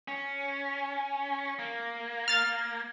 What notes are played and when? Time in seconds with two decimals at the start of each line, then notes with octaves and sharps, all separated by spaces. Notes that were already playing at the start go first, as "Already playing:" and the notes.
0.08 C#4
1.59 A#3
2.28 F6 A6